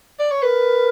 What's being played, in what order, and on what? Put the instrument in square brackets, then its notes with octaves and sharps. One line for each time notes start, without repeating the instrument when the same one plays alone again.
[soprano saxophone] D5
C#5
[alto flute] A#4 [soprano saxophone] B4